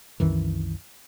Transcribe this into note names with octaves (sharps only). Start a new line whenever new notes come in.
C2 F#2 D#3 E3